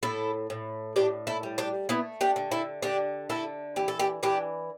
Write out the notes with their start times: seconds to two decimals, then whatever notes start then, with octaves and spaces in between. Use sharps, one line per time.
0.03 A2 E4 A4
0.50 A2
0.96 A2 D4 G4
1.27 E4 A4
1.43 G3
1.58 D4 G4
1.89 A3 B3 E4
2.21 D4 G4
2.36 D3
2.51 E4 A4
2.82 D3 D4 G4
3.29 D3 E4 A4
3.76 E3 G4
3.88 A4
3.99 D4 G4
4.23 E3 D4 G4